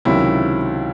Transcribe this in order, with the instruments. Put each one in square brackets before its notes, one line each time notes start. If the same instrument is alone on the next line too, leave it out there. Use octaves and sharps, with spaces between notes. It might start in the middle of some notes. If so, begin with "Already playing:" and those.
[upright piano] C#2 C3 D#3 F#3 E4